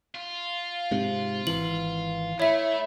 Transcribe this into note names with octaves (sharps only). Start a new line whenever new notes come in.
F4
G#2 C3
G#1 E3 F#7
A3 E4 C#5 E5